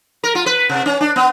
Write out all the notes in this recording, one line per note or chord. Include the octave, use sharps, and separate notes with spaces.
A#4
F4
B4
C3
C#4
D4
B3